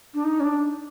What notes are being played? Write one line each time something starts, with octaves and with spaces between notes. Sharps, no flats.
D4
D#4
C#4
D4